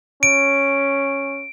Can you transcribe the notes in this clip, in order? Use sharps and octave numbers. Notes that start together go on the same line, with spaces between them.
C#4 D7